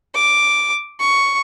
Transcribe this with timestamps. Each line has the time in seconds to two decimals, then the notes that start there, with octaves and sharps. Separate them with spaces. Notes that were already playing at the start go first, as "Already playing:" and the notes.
0.15 D6
1.00 C#6